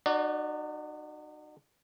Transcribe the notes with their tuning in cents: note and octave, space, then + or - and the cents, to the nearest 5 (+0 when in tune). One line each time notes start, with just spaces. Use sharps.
D#4 -40 F#4 +5 D5 +0